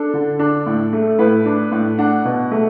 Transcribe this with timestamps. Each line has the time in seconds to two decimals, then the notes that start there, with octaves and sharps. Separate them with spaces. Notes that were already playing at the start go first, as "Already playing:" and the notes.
Already playing: D4 A4
0.14 D3
0.39 D4
0.66 A2
0.93 A3
1.19 A2 B4
1.46 D4
1.72 A2
1.98 D4 F#5
2.25 B2
2.51 A3